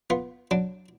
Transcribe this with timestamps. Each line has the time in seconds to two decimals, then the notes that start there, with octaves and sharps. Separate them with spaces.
0.10 B3 F4
0.51 F#3 D4